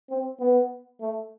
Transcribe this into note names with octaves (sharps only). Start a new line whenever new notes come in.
C4
B3
A3